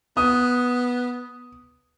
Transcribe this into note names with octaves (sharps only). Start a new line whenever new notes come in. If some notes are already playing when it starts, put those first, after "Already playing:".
B3 D#6